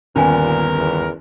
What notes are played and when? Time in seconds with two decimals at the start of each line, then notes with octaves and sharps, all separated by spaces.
0.16 G1 D#2 A#2 B3 C#4 A#4 G#5
0.76 E2